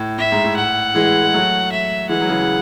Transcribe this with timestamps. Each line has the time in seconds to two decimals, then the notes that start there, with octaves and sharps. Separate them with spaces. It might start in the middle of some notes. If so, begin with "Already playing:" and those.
Already playing: A2
0.18 A2 E5
0.32 G#2
0.44 A2
0.56 F#5
0.95 E3 G#3
1.23 G#3
1.34 F#3 A3
1.72 E5
2.09 E3 G#3 F#5
2.21 F#3
2.29 C#3 E3